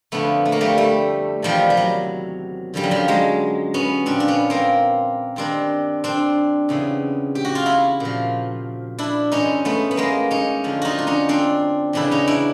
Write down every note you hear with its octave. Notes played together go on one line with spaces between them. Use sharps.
F2 D3 F3 A3 B3
A3
A#3
G3 A3
G3 A3
E2 C3 D#3 F3 G3
G3
F#3
F#2 D3 F3 G3
F#3
F3 G3
F#3 G#3
B3 C#4
A#2 F3 C4 D4
D4
B3 C#4
A#3 C4
G2 D#3 C4 D4
C4 D4
E2 C#3 E3
G4
F#4
F4
E4 F#4
A#2 F3
D4 E4
G#2 E3 C#4 D#4
A3 B3
B3
G#3 A#3
C#4 D#4
F2 D3 F3
D#4 F4 F#4
D4
C#4 D#4
C4 D4
E2 C#3 E3 D4 E4
C#4 D#4
D4 E4